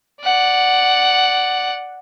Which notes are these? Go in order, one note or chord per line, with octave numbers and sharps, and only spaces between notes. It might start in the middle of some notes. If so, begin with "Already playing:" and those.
D5 F#5